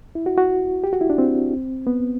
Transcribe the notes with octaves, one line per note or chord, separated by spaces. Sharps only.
E4
F#4
F#4
G4
F#4
E4
D4
C4
B3